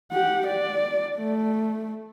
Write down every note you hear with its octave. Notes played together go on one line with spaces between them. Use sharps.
G4 F#5
D5
A3